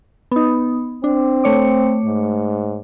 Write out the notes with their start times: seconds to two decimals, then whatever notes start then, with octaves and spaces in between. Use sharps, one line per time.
0.31 B3 D#4
1.04 C4 D4
1.44 A3 C#5 D6
2.05 G#2